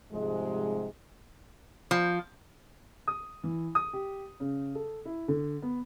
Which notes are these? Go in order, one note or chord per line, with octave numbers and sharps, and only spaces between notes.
G#2 C3 F3 G3 G#3
F3
D#6
E3
D#6
G4
C#3
A4
E4
D3
B3